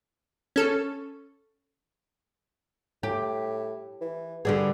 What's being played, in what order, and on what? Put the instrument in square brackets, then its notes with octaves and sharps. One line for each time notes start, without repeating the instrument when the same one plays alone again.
[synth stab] C#4 A4
[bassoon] A2 [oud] G4
[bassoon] E3
[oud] D3 G3 G#4 [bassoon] B3